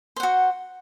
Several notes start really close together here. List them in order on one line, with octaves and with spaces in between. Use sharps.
C5 F#5 F#4